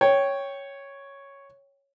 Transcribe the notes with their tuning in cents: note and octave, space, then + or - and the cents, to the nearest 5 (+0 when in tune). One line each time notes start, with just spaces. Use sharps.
C#5 +0 G5 +0